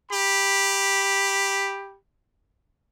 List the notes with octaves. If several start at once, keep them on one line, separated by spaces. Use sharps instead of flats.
G4 B5